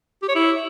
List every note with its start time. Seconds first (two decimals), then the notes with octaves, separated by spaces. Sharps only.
0.22 G4
0.29 C#5
0.35 E4